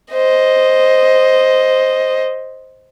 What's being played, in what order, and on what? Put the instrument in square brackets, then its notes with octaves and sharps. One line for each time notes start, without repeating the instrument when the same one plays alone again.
[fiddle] C5 D#5